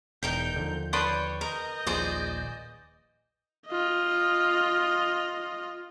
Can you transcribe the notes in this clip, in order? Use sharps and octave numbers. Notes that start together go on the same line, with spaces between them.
E1 E2 D#4 A#4 G5 G6
D#2 D3 F3
B4 C#5 D5 G5 A5 C6 D#6
A#4 D#5 G6
D#1 A#1 A#2 G#4 C5 D5
F4 D#5